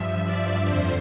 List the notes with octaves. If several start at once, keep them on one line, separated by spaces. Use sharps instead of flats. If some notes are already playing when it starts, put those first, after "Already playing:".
Already playing: G2 F3 E5
D5
F2 D3 F3 C5